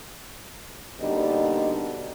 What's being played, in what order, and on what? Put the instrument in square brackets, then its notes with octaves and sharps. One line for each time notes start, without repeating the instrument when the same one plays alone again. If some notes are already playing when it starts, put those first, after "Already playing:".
[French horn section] B2 D3 G3 A#3 D#4